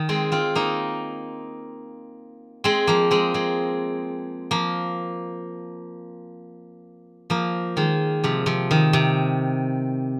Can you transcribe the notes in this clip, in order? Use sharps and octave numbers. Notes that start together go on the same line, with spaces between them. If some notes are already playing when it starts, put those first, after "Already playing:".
Already playing: D#3
G#3 C4
C4 F4
A#3 D#4
G#3 C4
F3 A#3
G#3 C4
G#3 C4
F3 A#3
F3 A#3
D#3 G#3
C3 F3
C3 F3
D#3
C3